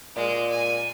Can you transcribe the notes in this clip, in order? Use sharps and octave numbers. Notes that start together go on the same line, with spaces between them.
A#2 G#3
G#5